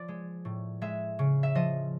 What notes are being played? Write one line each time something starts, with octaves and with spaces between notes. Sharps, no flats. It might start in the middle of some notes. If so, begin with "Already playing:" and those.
Already playing: F3 D5
G#3
A2
G#3 E5
C#3
E5
F3 D#5